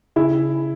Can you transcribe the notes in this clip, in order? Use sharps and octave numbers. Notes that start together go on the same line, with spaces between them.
C#3 E4 G#4